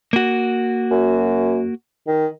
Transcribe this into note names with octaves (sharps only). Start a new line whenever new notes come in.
A#3 F#4
F#2
D#3